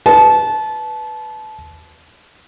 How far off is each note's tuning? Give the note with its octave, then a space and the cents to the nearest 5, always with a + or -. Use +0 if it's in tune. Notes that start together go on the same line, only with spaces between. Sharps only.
B4 +0 A5 -25